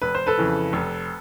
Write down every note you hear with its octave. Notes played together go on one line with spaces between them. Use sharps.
F1 B4
C5
A4 B4
F2 C#3 E3
F1